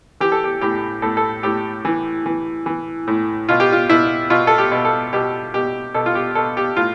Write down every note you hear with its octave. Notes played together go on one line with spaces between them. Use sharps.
E3 G4
A4
G4
A2 G4
A2 A4
A4
A2 G4
E3
E3
E3
A2
B2 F4
G4
F4
B2 E4
B2 F4
A4
G4
B2
A4
B2 G4
B2 G4
B2 A4
F4
G4
B2 A4
G4
A2 F4